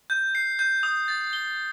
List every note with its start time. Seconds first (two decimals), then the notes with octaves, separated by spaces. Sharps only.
0.10 G6
0.35 C7
0.59 G6
0.83 D#6
1.08 A6
1.33 G7